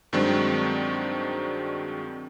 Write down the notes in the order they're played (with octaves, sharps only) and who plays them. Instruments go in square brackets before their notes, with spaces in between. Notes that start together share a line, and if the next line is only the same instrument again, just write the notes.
[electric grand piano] G2 D#3 F#3 G#3 C4 D4